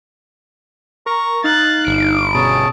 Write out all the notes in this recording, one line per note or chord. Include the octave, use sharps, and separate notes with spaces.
A#4 A#5 C#6
D#4 F5 F#6 A6
G1 D7
B2 C#4 G#4 A5